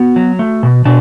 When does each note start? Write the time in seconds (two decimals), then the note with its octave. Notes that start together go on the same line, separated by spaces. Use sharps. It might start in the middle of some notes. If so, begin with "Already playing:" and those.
Already playing: B3 F#4
0.16 F#3
0.39 A3
0.63 B2
0.85 B2 D4